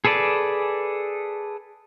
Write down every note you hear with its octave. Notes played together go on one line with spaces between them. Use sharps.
G#4 A4 B4 D5 A5